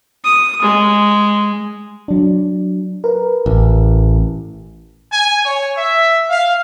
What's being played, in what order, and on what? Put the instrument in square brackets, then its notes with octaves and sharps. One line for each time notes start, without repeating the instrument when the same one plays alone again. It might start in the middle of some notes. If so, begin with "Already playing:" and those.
[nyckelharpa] D#6
G#3
[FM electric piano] F#3 D4
A#4 B4
[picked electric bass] A1
[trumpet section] G#5
C#5
E5
F5